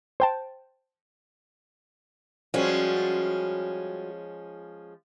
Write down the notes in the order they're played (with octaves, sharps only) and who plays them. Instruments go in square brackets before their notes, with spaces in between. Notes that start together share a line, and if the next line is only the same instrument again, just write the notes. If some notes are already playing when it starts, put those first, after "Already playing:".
[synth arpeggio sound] C5 G5 A5
[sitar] F3 G#3 C#4 [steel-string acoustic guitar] G3 F#4